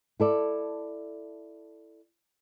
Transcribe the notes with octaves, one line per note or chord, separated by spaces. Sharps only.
E4 A4 D5